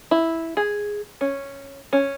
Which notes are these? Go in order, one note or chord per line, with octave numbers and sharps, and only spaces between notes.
E4
G#4
C#4
C#4